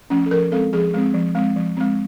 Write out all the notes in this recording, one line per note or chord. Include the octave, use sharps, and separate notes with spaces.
F3 A3 C#4
A4
F3 A#4
G#3 C4 A4
F3 G#4
G#3 C4
F3
G#3 C4
F3
G#3 C4